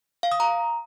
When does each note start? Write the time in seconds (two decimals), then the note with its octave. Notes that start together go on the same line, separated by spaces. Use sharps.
0.23 F5
0.32 D#6
0.40 A#5